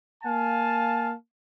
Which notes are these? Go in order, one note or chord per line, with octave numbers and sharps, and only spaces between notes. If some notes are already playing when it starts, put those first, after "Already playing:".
A#3 F5 G#5 A5